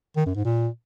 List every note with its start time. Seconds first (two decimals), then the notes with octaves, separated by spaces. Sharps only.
0.16 D#3
0.26 F#2
0.35 G#2
0.45 A#2